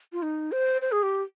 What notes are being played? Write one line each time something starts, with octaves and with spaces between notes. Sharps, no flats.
F4
D#4
C5
C5
G#4
G4